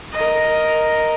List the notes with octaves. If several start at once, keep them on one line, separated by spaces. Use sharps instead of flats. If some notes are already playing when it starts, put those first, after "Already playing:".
A#4 D#5